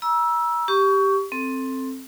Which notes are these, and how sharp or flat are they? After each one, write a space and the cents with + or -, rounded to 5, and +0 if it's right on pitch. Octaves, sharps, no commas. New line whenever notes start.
A#5 +40 E6 +0
G4 +0 C#6 +25
C4 +10 A4 +0